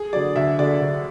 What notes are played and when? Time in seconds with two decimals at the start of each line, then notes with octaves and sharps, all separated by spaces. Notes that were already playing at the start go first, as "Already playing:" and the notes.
Already playing: G#4
0.13 D3 F#3 D5
0.36 D2 E5
0.59 D3 F#3 D5
0.81 D2